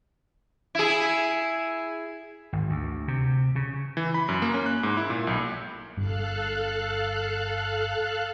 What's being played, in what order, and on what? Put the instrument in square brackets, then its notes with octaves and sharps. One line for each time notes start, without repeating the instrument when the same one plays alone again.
[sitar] E4 G#4
[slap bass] G#1
D2
C3
C#3
[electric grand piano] E3
B5
F#2
A#3
C#4
F#6
G#2
E4
A#2
B1
[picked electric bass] G1 G2 [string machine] A4 F5 F#6